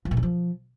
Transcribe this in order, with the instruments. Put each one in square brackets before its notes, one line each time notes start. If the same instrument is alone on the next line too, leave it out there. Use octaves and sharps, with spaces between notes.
[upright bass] F3
A#2
D#3
F3